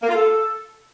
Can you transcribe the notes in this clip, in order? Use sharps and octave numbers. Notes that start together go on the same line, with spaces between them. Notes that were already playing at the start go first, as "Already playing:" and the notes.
A#3
F4
A4